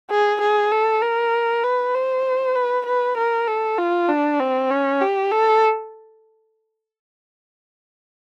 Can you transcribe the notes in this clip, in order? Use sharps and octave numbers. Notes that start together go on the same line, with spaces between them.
G#4
G#4
A4
A#4
B4
C5
B4
B4
A#4
A4
F4
D4
C4
C#4
G4
A4